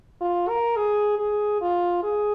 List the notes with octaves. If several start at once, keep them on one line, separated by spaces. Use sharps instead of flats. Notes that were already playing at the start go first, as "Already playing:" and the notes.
F4
A#4
G#4
G#4
F4
G#4